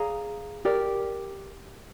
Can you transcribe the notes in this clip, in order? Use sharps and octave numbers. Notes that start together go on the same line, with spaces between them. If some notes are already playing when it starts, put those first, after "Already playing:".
Already playing: G#4 D5 F5 A#5
G4 A#4 D5